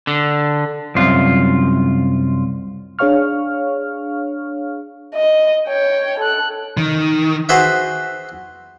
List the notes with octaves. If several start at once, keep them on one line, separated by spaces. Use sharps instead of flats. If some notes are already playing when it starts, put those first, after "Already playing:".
D3
C2 F#2 F4
D4 G#4 C#5 F5 C#6 F6
D#5
C#5 G5
A4 F#6
D#3
F#4 G#4 B4 C5 E5